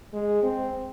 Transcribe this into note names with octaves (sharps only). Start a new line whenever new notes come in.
G#3
C4